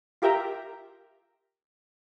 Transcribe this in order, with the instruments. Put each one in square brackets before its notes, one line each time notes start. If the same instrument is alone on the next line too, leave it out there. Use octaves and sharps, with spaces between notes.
[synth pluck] F4 G4 A#4 E5 G5 A#5